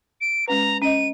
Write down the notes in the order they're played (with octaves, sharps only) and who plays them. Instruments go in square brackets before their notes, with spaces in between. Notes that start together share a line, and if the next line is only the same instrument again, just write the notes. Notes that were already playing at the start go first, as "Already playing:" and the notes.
[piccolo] D7
[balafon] G#3 C#4 B4 [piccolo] A#5
[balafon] C#4 D#5 [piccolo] D#7